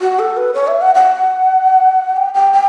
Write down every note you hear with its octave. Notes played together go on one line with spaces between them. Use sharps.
F#4
A4
B4
C#5
E5
F#5
F#5
G5
G5
G5